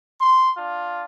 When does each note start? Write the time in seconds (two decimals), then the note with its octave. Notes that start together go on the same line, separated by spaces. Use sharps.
0.20 C6
0.56 D4 F4